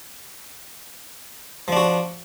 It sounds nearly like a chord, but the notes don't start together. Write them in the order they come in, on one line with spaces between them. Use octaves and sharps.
F3 D4 F#4